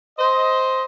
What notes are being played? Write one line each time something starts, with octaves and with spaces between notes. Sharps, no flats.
C5 D#5